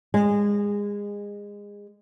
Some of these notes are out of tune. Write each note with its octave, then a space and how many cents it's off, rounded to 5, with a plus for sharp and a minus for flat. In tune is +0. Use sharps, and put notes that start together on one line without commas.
G#3 -25